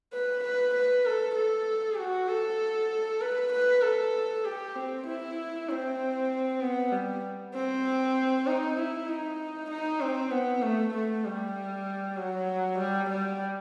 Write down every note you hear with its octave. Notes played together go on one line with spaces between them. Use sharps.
B4
B4
B4
A4
A4
F#4
A4
B4
B4
A4
G4
C4
E4
C4
B3
G3
C4
D#4
E4
D#4
D#4
C4
B3
A3
A3
G3
F#3
G3
G3